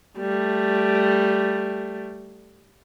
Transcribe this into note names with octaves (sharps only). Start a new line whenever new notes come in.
G3 A3